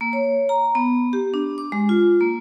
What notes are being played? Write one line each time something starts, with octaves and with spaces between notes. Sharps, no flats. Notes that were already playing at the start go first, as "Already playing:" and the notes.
A#3
C#5
A#5
B3
G4
D4
D6
G#3
F4
A#3